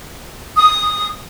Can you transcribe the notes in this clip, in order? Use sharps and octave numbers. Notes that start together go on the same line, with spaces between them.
D#6